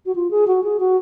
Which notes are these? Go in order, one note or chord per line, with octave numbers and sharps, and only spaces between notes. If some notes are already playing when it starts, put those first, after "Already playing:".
F#4
F4
G#4
F#4
G#4
F#4